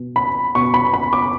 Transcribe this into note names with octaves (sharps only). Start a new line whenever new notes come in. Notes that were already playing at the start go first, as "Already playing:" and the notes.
Already playing: B2
B5
B2 C#6
B5
B5
D6